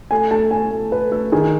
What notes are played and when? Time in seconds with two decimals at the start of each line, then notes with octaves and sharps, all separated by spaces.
0.11 A3 G#5
0.31 A3 A5
0.51 A3 G#5
0.71 A3
0.92 A3 B4
1.12 A3 A4
1.32 D#3 G#4